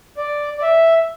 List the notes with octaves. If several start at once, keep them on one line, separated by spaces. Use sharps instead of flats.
D5
D5
E5